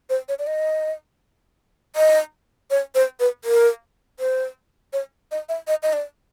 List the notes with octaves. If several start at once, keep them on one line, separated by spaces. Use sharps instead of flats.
C5
C#5
D5
D#5
D#5
C#5
C5
B4
A#4
C5
C#5
D#5
E5
D#5
D#5
D5